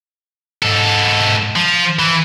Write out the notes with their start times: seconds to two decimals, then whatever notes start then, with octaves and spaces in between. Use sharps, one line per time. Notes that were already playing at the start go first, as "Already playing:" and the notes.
0.63 G#2 A4
1.56 F3
1.99 E3